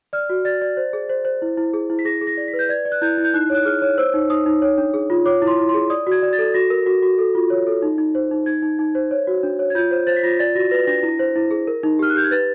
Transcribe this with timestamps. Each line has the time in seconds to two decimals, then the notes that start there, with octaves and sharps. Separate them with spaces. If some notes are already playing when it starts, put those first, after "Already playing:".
0.13 D5 F6
0.30 F#4
0.45 D5 A6
0.62 D5
0.77 C5
0.93 G#4
1.10 C5
1.25 C5
1.42 E4
1.57 E4
1.74 G#4
1.90 E4
1.99 B6
2.05 G#4 A#6
2.21 G#4
2.27 A#6
2.37 D5
2.48 B6
2.53 B4
2.59 G6
2.69 D5 G#6
2.85 D5
2.92 F#6
3.01 E4 G6
3.18 E4
3.24 G6
3.34 D#4 F#6
3.50 C#5 F#6
3.65 G#4 F6
3.82 C#5
3.98 C5 E6
4.14 D#4
4.30 D#4 D#6
4.46 D#4
4.62 C#5
4.78 D4
4.94 G#4
5.10 F4
5.26 C#5 D6
5.42 E4
5.47 C6
5.58 E4
5.69 C6
5.74 G#4
5.90 D5 D#6
6.07 F#4 G#6
6.23 D5
6.33 A6
6.38 A4
6.54 F#4 A#6
6.70 A#4
6.86 F#4
7.03 F#4
7.18 A4
7.35 F4
7.50 C#5
7.67 A4
7.82 D#4
7.98 D#4
8.15 C5
8.31 D#4
8.46 D#4 G#6
8.62 D#4
8.79 D#4
8.95 C5
9.11 C#5
9.27 F#4
9.43 D4
9.59 C#5
9.70 G#6
9.75 F4 G6
9.91 C5
10.07 C5 A6
10.17 B6
10.23 F4 A#6
10.39 D5 A6
10.55 F#4 A#6
10.71 B4 A#6
10.87 D4 A#6
11.03 E4
11.19 C5
11.36 E4
11.51 G#4
11.67 A#4
11.83 D#4
11.99 G4 F6
12.10 F#6
12.15 G4 G6
12.24 G#6
12.31 B4 A6